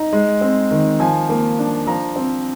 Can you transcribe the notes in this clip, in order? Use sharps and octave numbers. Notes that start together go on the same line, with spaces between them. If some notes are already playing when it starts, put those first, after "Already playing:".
Already playing: D#4 A#5
G#3
C4
D#3
F3 G#5
A#3
D4
F3 A#5
C4